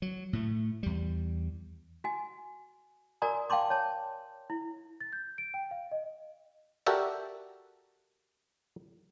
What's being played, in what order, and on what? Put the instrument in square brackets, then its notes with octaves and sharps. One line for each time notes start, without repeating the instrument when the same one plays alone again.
[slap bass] F#3
A2 A3
E2 G3
[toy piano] F#4 G#5
F#4 A#4 D5 G#5 A#5 D#6
F5 G5 A5 C6 D6
C#5 A5
E4
[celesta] A6
G6
D7
G5
F5
D#5
[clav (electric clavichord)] F#4 G4 A4 A#4 D5 E5